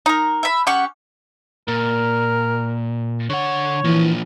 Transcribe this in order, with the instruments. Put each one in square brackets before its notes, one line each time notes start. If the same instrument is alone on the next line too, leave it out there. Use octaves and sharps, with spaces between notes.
[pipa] D#4 A#4
[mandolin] E5 B5
[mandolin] C#4 F#5 C#6 [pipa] G4
[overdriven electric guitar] A#2 [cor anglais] A#4
[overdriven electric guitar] D3 F#5 [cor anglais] C#5
[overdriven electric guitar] A#2 F3 [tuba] E3